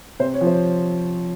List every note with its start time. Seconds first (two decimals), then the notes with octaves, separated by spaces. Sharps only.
0.19 C3 C5
0.34 C#5
0.41 F3
0.47 C5